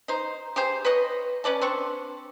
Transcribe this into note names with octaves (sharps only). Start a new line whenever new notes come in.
D#4 C5
G4 G#4 C5
B4 C#5 D#5
C#4 B4 D5 A5
C4 D4 C#6